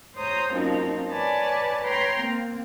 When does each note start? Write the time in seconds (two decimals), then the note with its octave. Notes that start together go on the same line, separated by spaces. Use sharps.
0.15 C5 C#5 A#5 D#6 G6
0.52 F#2 A#2 F3 C4 D#4
1.09 B4 C#5 D5 G#5 A5
1.82 B4 C#5 G5 A#5 C6
2.18 A#3 C4